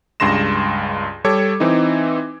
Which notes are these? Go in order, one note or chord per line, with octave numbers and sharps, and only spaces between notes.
C#2 G2 G#3 C6 A#6 E7
G3 A4 C#5 D6 G#6
E3 C4 D#4